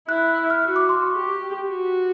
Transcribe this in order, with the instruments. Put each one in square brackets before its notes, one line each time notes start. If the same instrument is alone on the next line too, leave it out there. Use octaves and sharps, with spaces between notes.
[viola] E4 [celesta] F#6
[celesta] E6
F6
[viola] F#4 [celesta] F#6
[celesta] D6
C6
C#6
[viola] G4
F#4